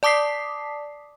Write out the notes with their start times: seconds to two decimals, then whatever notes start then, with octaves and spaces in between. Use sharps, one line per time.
0.03 D5 A5 D6 D#6 B6 C7